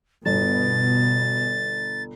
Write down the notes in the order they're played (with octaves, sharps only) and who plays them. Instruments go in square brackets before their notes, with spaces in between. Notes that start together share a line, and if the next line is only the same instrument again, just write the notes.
[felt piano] G1 [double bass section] B2 [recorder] A6